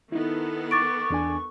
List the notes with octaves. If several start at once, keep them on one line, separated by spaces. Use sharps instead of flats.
D#3 B3 D#4 E4 A4
C#6 D6 A6 D7
E2 D4 G#5